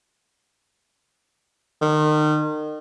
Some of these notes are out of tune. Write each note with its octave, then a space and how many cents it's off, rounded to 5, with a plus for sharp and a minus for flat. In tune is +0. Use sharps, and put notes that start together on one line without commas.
D#3 -35